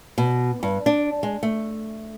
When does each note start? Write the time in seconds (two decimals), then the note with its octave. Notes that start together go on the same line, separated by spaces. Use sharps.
0.18 B2
0.63 G2
0.86 D4
1.23 G#3
1.43 A3